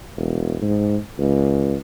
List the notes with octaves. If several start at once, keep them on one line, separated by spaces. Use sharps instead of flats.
E1
G#2
C#2